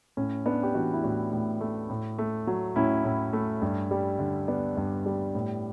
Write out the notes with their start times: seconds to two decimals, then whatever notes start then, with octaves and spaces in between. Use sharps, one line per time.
0.17 A2 C#4
0.46 A3 B3 D4
0.63 G4
0.75 E3 D4 F#4
0.93 E4
1.03 A2 D4 F#4
1.33 A2
1.61 A3
1.90 A2
2.18 A3
2.47 F#3
2.76 A2 C#4 E4
3.05 A2
3.33 A3
3.62 G2
3.91 G3
4.19 D3
4.48 B3 D4
4.77 G2
5.06 G3
5.35 A2